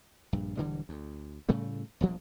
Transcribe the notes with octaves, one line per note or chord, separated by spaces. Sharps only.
A#1 G2
E1 D3 E3 G3
D2
A2 C#3 G3 A3
E1 A#1 F3 G3